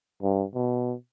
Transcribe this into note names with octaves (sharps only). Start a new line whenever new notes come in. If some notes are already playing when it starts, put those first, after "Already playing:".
G2
B2